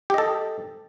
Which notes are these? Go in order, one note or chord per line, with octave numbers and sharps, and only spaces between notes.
G4 A4 D#5